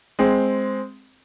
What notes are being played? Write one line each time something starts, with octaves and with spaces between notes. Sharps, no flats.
G#3 C4